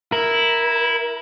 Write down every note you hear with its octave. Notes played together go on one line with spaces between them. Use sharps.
E4 A#4